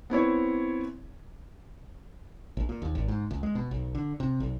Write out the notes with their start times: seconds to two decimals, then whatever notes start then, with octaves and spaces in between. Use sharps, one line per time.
0.10 B3 C4 E4 C#5
2.57 A#1
2.69 A#2
2.82 D#2
2.95 G#1
3.08 G#2
3.31 C#2
3.43 G#3
3.55 B2
3.71 B1
3.95 D3
4.20 C3
4.40 B1